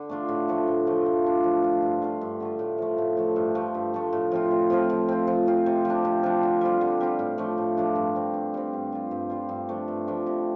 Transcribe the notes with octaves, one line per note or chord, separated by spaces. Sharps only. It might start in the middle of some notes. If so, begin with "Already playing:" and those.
Already playing: D3
A3 D4 F4
A2
F3 A3
A2
F3 A3
F3
D4 F4
F3
D4 F4
G2
D3 A3 F4
G2
D3 A3 F4
A2
F3 A3
A2
F3 A3
G2
F3 A3
G2
F3 A3
A2
F3 C4 F4
A2
F3 C4 F4
F3
C4 F4
F3
C4 F4
C3
F3
D4
C3
F3 D4
D3
G3 C4 F4
D3
G3 C4 F4
A2
F3 A3 D4
A2
F3 A3 D4
G2
G3 C4
G2
G3 C4
G2
G3 F4
G2
G3 F4
G2
F3 A3 D4
G2
F3 A3 D4
C3